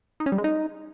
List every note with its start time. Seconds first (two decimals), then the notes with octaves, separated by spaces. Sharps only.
0.20 D#4
0.26 C#4
0.32 G3
0.38 G#3
0.44 D#4